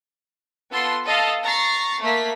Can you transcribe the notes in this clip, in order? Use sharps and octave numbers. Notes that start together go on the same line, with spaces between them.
B3 F4 A4 C6
A4 D#5 F5 A5
A#5 C#6 A6 C7
A3 A#3 B6